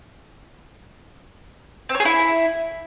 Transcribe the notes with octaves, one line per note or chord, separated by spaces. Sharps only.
C4
C#5
G#4
E4